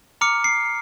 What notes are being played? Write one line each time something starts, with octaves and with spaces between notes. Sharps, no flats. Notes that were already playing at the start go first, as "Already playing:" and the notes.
A#5 D6 F6 C#7
C7